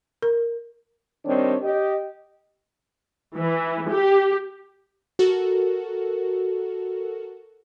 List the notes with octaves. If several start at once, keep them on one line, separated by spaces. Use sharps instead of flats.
A#4
D#3 G3 C4 D4 C#5
G4 D#5
E3
G4
F#4 A4 A#4